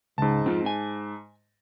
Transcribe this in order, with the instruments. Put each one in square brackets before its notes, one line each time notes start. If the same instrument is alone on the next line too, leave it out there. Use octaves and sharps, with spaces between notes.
[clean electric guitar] C#2 [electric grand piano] G#2 A5
[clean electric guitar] C4 F4
G#5